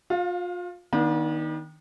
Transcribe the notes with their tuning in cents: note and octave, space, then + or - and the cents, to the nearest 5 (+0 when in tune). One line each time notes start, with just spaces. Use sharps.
F4 +35 F5 +0
D#3 +10 B3 -45 D4 +0